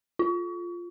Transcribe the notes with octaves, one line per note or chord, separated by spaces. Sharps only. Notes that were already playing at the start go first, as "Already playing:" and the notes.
F4